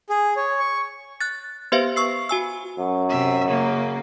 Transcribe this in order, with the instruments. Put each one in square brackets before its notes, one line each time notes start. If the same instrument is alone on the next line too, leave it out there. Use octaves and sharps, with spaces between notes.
[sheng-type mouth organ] G#4
C#5
C#6
[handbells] F#6 A6
B3 G4 B4 C5 E5 F5
C#6 E6 C7
F#4 G#5 E6
[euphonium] F#2
[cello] C3 E5
C#3 A#3